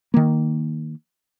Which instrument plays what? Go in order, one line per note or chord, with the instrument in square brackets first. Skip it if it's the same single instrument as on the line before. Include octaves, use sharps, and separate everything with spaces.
[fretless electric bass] D#3 A#3